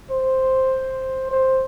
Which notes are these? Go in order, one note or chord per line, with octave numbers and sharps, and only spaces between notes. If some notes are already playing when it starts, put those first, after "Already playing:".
C5
C5